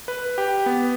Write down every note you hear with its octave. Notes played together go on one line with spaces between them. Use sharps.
B4
G4
B3